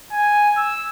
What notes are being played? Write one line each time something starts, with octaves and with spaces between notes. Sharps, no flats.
G#5
E6